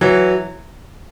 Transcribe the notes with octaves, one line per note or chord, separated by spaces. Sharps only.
E3 F#3